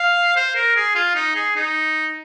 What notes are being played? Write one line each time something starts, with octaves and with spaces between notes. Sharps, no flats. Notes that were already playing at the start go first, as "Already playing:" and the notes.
Already playing: F5
C5
A#4
G#4
F4
D#4
G#4
D#4